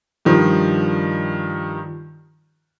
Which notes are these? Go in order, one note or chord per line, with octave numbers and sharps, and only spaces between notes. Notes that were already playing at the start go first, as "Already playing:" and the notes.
G2 D#3 F3